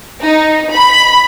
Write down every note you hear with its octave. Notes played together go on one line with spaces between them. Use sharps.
D#4
B5